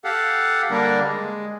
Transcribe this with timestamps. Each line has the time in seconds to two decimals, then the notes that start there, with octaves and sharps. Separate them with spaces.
0.04 G4 A4 F5 F#5
0.71 D3 G3 A#3 D4 A#4
1.05 G#3